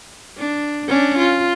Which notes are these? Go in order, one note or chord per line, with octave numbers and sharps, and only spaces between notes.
D4
C#4 D4
F4